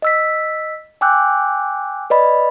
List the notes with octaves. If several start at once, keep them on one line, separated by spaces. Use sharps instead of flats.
D#5 E6 B6
G5 G#5 D6 E6 F#6 G6
B4 D5 D#5 B5